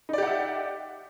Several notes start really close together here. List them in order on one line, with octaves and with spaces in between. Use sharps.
D#4 D5 G4 F#5 E5